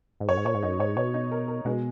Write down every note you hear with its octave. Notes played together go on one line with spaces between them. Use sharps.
G#2
F#2 C#5
G#2
A#2 C#5
G#2
F#2 D#4
G#2 C#5
B2 C#5
D#4
A#4
A#4
B2 G#3